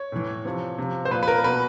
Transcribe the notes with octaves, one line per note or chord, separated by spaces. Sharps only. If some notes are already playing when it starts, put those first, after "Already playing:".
Already playing: C#5
A2 E3
C3 F3
C3 F3
C5
A#2 F3 B4
B4
A#4
B2 B4